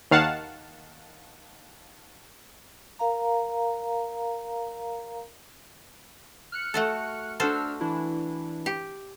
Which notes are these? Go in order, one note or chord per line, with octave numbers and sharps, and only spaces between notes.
D#2 D#3 F5 F#5 A5
A#4 F5 A#5
F6 F#6 C#7
A3 F#4 A4
D4 F#4 A4 C5 E6 F6
E3 D4 E4
G4